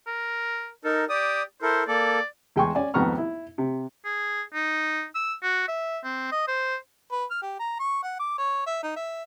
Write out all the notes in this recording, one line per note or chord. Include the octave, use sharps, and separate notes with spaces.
A#4
D#4 A4 A#4
G4 D5 D#6
E4 A4 A#4 C5
A#3 A4 D5
E2 G#3 G5 G#5 C6 C#6
C#4 D5 G#5
G#1 F2 B3 A#5 C#6 F6
E4
C3
G#4
D#4
E6
F#4
E5
C4
D#5
C5
B4
F6
G4
A#5
C#6
F#5
D6
C#5
E5
D#4
E5